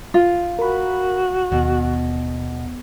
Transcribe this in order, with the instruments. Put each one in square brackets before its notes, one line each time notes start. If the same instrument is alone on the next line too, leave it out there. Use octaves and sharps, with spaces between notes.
[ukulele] F4
[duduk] F#4 [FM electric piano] A#4 B5
[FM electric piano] D#2 [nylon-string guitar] B2